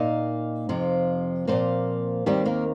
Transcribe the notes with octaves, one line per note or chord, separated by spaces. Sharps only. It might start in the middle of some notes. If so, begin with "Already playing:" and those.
Already playing: A#2 A#3 D#4 D#5
F2 C3 F3
A#2 F3 A#3 C4 C5
D#2 D#3 G3 C4 G4
A#3 A#4